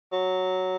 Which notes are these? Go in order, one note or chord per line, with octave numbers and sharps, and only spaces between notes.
F#3